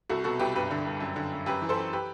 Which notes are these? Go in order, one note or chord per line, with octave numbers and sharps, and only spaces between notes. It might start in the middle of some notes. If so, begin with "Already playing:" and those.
C2 F#4 A4
B2 F#4 A4
C2 G4 B4
G2 G4 B4
D3
G2
F#2
D3
F#2
F#2 G4 B4
E3
A4 C5
F#2
G4 B4